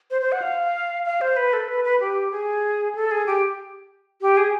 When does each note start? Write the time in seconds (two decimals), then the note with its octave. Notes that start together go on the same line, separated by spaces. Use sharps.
0.11 C5
0.21 C5
0.32 F#5
0.42 F5
1.06 F5
1.21 C5
1.37 B4
1.53 A4
1.68 B4
1.84 B4
2.00 G4
2.32 G#4
2.95 A4
3.11 G#4
3.26 G4
4.22 G4
4.37 G#4